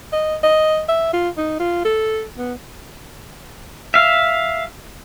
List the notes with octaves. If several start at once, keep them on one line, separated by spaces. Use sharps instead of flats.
D#5
D#5
E5
F4
D#4
F4
A4
B3
E5 F5